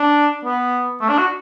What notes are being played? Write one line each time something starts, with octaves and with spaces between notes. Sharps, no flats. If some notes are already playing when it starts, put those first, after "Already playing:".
Already playing: D4
B3
A3
D4
F#4